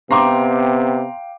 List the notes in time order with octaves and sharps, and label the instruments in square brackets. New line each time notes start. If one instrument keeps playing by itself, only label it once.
[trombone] C3 [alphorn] B3 [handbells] F5 G5 [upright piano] A#5 C6 D6